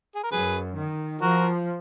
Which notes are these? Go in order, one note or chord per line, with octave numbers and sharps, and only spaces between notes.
G#4
A#4
F#2 G#4 B4
D#3
F3 F#4 A#4